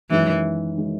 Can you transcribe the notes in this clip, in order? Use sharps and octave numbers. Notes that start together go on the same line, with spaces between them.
F#2 D#3 E3 G#3
D#3 G#3